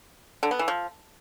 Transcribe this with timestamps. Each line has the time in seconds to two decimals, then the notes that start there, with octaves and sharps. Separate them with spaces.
0.43 D3
0.51 B3
0.59 E3
0.68 F3